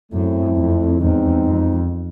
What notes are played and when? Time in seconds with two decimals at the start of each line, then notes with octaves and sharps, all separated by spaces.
0.12 F#2 A3 C4 E4
0.56 F2
1.00 E2 G#3 C4 D#4
1.45 F2